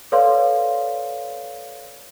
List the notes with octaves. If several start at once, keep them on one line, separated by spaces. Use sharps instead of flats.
A4 B4 C#5 D5 F5 C6